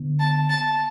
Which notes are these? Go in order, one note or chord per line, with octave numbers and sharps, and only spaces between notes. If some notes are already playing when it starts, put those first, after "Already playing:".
Already playing: D3 B3
A5
A5